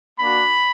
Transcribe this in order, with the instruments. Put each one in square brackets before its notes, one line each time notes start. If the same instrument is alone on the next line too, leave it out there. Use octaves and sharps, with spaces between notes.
[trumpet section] A#3 D4 F#4 B5